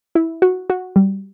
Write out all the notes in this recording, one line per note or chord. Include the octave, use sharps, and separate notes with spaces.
E4
F#4
F#4
G3